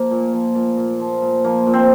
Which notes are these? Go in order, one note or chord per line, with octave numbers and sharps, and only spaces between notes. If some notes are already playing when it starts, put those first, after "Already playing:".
Already playing: F3 A#3
A#2
F3
A#2
A#2
F3
A#2
F3 A#3
A#2
C4